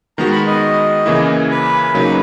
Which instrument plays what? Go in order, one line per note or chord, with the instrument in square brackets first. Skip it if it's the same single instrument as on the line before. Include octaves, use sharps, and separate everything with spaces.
[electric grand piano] D#3 G#3 B3 F#4 [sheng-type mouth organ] A#5
[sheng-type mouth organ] B5
D#5
[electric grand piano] C#3 E3 A#3 E4
[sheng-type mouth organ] B4
[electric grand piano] C#3 F#3 A#3 D#4